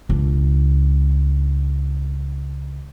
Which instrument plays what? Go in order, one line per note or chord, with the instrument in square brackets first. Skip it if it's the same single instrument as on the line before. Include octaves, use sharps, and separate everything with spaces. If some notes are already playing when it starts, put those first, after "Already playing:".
[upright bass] C#2 D4